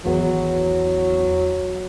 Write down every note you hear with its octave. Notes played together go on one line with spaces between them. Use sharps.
G#1 E2 F#3 B3